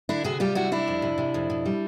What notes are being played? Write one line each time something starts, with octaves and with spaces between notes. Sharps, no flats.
D3 D4 E4
C3 F#4 G#4
G3 F4 G4
C3 E4 F#4
G3 D4 E4
F2
C3
C3
F2
B2
G3